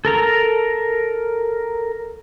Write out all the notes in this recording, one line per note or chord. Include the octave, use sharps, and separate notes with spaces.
A4 A#4 A#5